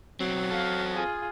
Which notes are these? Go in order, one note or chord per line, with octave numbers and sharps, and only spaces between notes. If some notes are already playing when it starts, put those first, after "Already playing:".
B1 F#3 C4
C4 A4 F5
F4 G#4